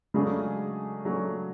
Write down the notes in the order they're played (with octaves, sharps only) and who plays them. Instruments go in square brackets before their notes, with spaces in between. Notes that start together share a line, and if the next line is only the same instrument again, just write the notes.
[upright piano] C#3 F#3 A3 D4 G#4 [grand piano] G#3
[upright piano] C#3 F#3 A3 D4 G#4